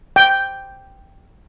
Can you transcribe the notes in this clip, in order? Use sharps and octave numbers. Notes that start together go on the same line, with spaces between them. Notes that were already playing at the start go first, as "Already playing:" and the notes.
G5